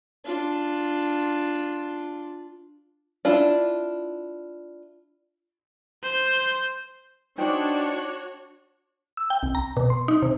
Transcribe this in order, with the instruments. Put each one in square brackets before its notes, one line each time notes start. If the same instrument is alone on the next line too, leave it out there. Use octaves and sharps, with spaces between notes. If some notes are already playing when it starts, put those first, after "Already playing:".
[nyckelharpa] D4 F4
[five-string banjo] D4 E4 F4
[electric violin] C5
[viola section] D4 [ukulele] D#4 C5 G5 [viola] F#4 C#5
[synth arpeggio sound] E6
G5
C2
A#5
B2
C6
D#4
C3